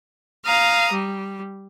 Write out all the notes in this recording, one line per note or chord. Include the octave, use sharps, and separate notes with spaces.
F5 A#5 D#6
G3